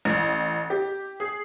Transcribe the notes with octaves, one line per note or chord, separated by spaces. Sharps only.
A1
G4
G#4